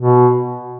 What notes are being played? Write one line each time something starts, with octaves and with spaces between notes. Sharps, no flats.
B2